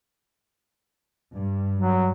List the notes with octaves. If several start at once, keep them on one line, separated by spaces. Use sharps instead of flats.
G2
F#3